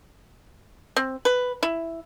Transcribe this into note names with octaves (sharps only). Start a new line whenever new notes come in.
C4
B4
E4